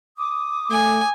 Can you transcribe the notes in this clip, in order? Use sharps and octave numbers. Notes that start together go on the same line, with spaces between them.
D6 D#6
A3 G#5